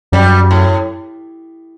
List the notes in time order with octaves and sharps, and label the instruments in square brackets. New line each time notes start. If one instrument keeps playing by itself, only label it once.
[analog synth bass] F#2 [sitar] G3
[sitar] A2